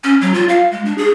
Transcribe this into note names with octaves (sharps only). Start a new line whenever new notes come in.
C#4
F#3
F4
F5
G#3
D4
G#4